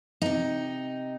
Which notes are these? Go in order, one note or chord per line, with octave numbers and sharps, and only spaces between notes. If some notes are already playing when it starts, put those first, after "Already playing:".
C3 D#4